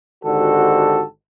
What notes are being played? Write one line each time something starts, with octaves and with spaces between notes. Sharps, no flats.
G#1 D3 F#4 G4 A4